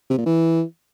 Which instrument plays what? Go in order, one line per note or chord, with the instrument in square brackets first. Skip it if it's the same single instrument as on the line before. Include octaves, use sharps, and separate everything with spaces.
[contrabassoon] C3
A#2
E3